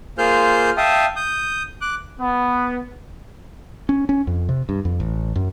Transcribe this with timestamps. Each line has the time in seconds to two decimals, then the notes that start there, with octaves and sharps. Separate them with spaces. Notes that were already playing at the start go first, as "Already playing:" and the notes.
0.18 A#3 F4 G#4 C5 F6 G6
0.77 E5 F5 G5 A5 D#6
1.16 D#6 G6
1.81 D6 F#6
2.20 B3
3.89 C#4
4.09 C#4
4.27 F2
4.49 C3
4.69 G2
4.85 F2
5.00 A1
5.36 F#2